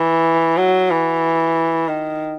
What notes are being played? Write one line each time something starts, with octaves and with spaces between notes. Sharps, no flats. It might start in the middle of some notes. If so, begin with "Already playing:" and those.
Already playing: E3
F#3
E3
D#3